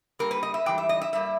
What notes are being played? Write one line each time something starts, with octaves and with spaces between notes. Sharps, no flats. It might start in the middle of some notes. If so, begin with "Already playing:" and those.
G2 G3 A#3 A#4
B4
D#5
E5
G#2 E3 G3 G5
E5
D#5
E5
G2 G3 A#3 E5